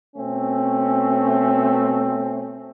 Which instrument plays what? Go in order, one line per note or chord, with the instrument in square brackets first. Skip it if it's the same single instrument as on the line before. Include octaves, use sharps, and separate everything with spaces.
[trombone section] B2 A3 C4 C#4